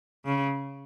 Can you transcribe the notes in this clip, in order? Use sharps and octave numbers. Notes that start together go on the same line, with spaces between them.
C#3